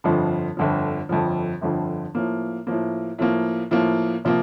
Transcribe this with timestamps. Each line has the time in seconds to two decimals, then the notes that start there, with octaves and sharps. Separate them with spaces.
0.04 G1 F2 D3 F3
0.57 G1 F2 D3 F3
1.09 G1 F2 D3 F3
1.62 G1 F2 D3 F3
2.15 A2 F3 A#3
2.67 A2 F3 A#3
3.19 A2 F3 A#3
3.71 A2 F3 A#3
4.25 C3 F3 A#3